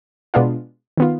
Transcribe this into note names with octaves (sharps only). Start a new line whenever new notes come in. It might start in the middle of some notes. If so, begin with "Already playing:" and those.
B2 G#3 B3 D4 F4
D#3 B3 F4